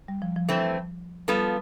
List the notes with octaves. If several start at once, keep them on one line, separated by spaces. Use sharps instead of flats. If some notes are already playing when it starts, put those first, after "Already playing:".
G3
F3
F3
E3 A3 C4
F3 G3 B3 F4 A4